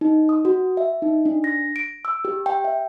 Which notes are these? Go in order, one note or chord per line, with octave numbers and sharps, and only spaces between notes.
D#4
D#6
F#4
E5
D#4
D4
A#6
D7
E6
G4
G5
E5